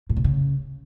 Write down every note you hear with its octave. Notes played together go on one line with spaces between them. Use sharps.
A2
C3
C#3